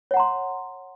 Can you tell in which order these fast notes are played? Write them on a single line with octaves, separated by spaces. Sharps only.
C#5 F#5 A#5 C6